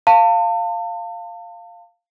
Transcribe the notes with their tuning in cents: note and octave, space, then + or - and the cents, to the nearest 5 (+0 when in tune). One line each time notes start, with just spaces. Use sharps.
F5 +0 A5 +35